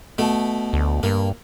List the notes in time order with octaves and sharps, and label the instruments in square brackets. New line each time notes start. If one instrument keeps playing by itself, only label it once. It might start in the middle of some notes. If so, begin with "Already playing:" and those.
[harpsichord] B2 A3
[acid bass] D2
[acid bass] G2 [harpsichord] A#3